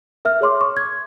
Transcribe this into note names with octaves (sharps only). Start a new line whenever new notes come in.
A#4 E5 F6
G#4 C#5 C6 D6
C#6
G#6